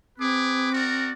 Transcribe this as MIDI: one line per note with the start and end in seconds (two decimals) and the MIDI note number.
0.19 1.12 60
0.19 0.72 68
0.19 0.72 71
0.19 0.72 86
0.73 1.11 66
0.73 1.11 70
0.73 1.11 74